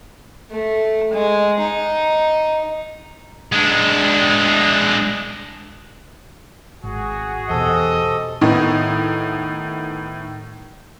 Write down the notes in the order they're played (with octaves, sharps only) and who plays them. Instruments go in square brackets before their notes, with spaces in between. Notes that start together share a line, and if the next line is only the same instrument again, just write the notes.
[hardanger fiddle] A3
G#3
D#4
[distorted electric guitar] G#3 D4
[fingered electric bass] G#1 [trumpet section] F#4 G#4
[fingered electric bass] E2 B2 [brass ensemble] G4 C5 D#5 [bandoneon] A4
[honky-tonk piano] A2 D#3 B3 D#5